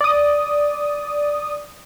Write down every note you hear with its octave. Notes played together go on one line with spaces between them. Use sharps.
D5 D#6